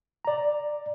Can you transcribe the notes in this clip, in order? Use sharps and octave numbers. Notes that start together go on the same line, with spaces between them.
D5 A#5